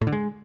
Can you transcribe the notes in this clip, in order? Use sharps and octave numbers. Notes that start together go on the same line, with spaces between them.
A2
D3
G#3